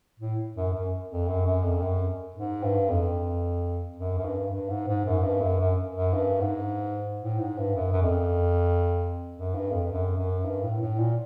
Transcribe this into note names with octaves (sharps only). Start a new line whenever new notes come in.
A2
F#2
F#2
F2
F#2
F#2
F2
F#2
G#2
G2
F2
F#2
F#2
G2
G2
G#2
G#2
F#2
G2
F#2
F#2
F#2
G2
G#2
A2
G#2
G2
F#2
F#2
F2
F#2
G2
F2
F#2
F#2
G2
A2
A2
A#2